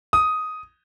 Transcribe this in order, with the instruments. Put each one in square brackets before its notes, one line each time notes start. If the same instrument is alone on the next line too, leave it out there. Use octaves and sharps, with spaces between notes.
[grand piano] D#6